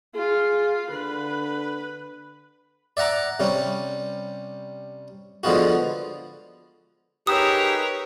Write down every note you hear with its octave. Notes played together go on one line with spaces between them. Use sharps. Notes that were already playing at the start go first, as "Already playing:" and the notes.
F4 G#4
D3 B4
D5 E5 F#5 A#5 D6
C3 G3 C#4
D3 F3 G#3 B3 F4 F#4
D#4 G4 G#4 A#4 B4 C#5 D#6 E6